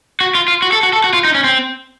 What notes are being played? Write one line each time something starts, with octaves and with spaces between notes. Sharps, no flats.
F#4
F4
F4
F#4
A4
F#4
A4
F#4
F4
D#4
C#4
C4